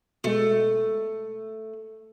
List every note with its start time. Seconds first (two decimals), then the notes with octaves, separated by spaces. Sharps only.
0.24 B2 G#3 A3